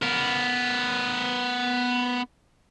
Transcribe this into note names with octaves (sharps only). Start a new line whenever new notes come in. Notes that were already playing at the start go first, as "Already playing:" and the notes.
B3 A#4